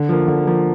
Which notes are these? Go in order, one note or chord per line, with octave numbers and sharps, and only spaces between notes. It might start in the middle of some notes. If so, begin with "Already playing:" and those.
Already playing: D3
F3 A#3
D3
F3 A#3